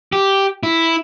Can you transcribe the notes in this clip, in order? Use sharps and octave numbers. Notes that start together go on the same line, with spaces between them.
G4
E4